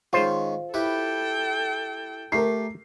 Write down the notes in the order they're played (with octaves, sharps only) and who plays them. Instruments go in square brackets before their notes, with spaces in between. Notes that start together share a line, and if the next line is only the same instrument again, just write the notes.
[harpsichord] D#3 G#3 C#4 [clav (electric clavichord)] F4 C5
[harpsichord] E4 G4 B4 [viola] A4 G5
[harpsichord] A3 G4 [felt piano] A#4 C7